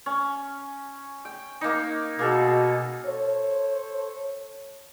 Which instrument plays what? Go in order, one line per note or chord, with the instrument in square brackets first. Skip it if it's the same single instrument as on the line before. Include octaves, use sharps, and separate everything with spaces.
[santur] C#4
G5
A#3 D#4
[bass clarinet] B2 [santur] A#3 G#4 A4
[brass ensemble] A4 C5 C#5